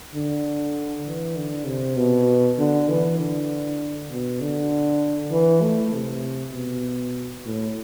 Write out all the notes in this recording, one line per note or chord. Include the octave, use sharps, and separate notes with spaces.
D3
E3
D3
C3
B2
D3
E3
D3
B2
D3
E3
A3
C3
B2
A2